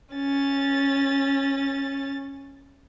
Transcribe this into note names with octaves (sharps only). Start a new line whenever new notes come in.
C#4 A6